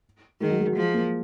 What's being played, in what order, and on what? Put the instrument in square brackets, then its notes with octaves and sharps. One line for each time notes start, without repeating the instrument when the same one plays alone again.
[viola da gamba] D#3 [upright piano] G#3
[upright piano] F#3
G#3
F#3
[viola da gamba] F3 [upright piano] G#3
[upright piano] A#3